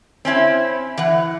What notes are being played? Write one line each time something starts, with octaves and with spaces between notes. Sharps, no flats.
C4 C#4 E4
E3 F#5